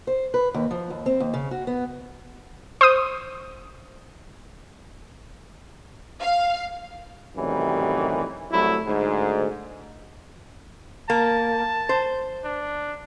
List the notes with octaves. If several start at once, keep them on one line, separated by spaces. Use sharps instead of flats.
C5
B4
D#2
F3
D#2
C4
D#2
C#3
F#4
B3
C5 D#6
F5
F#2 A2 C3 D#3 E3 G3
C2 F#3 A3 E4
D2 G#2
A#3 A5
C5
D4